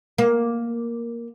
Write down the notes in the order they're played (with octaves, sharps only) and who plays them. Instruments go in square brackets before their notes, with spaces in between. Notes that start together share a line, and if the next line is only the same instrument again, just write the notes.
[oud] A#3